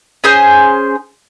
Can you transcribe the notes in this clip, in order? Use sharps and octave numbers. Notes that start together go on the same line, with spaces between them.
C#4 G#4 C5